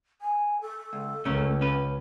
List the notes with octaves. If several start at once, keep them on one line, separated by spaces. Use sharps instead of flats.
G#5
A4
C#2
C#2 A3 C#4 A#4
C#4 B4